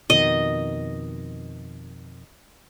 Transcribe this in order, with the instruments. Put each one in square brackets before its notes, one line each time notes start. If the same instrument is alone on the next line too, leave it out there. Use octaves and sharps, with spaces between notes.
[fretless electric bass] F2 B2 D#3 [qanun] D#5